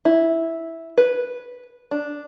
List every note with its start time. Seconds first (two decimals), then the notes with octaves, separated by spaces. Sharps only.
0.05 E4
0.98 B4
1.91 D4